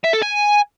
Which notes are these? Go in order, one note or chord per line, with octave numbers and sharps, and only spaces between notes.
E5
A4
G#5